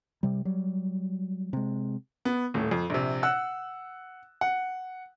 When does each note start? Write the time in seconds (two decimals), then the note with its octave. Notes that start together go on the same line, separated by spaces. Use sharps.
0.23 C3 G3
0.45 F#3 G3
1.53 C3 G#3
2.25 B3
2.54 D#1 A2
2.71 F2
2.90 A#1 C3
3.23 F#5 E6 F#6
4.41 F#5